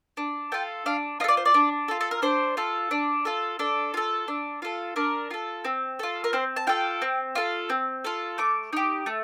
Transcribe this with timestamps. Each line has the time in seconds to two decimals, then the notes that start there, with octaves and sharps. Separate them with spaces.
0.17 D4
0.52 F4 A4 G5
0.86 D4 F5
1.20 F4 D#5
1.24 A4
1.28 D5
1.37 C5
1.45 D5
1.54 D4
1.88 F4 A4
2.01 A4
2.11 A#4
2.22 D4 C5
2.57 F4 A4
2.91 D4
3.25 F4 A4
3.59 D4 A4
3.94 F4 A4
4.28 D4
4.62 F4 A4
4.96 D4 A#4
5.31 F4 A4
5.65 C4
5.99 F4 A4
6.24 A#4
6.33 C4 C5
6.56 A5
6.67 F4 A4 G5
7.02 C4
7.35 F4 A4
7.70 C4
8.04 F4 A4
8.38 A3 D6
8.73 D#4 G4
9.06 A3